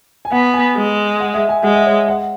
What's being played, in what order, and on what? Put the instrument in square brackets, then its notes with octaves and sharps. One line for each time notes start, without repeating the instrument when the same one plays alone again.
[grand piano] G#5
[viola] B3 [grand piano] F#5
[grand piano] G#5
[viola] G#3
[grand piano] F#5
E5
G#5
[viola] G#3 [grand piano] F#5
[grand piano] E5
C#5
F#5